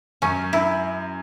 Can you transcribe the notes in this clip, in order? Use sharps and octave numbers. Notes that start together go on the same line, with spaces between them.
F#2 C#4
E4